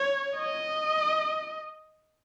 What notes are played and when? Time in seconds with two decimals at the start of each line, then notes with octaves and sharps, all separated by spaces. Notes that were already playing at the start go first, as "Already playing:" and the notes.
Already playing: C#5
0.37 D#5